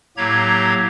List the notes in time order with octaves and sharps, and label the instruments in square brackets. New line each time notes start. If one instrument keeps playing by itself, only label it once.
[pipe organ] A2 F#3 A#3 G4 A#5 G#6